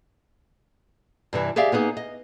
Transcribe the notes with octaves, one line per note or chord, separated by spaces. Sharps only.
G2 C3 E3
G4 G#4 D5 E5 F5
A#3 B3 D#4 G#4
D#5